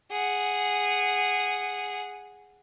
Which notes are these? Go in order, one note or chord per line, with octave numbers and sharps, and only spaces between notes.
G#4 F#5